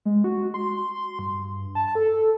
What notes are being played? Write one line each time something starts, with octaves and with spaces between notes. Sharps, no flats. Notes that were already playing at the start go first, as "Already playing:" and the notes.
G#3
F#4
C6
G2
A5
A4